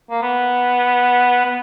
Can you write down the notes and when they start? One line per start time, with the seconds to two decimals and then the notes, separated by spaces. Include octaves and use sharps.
0.11 A#3
0.22 B3
1.45 B3